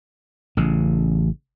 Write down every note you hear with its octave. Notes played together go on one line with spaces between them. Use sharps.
A1 C#3